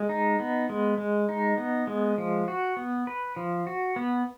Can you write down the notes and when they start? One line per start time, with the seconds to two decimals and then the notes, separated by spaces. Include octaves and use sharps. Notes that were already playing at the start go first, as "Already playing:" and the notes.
Already playing: G#3
0.09 D#4
0.40 B3
0.69 G#3
0.98 G#3
1.29 D#4
1.58 B3
1.87 G#3
2.18 F3
2.48 F#4
2.77 B3
3.07 B4
3.36 F3
3.67 F#4
3.96 B3